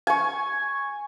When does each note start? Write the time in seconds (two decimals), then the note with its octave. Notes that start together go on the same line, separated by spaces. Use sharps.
0.07 G#5 C#6